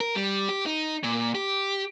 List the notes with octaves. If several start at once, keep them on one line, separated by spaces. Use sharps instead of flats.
A#4
G3
G4
D#4
A#2
G4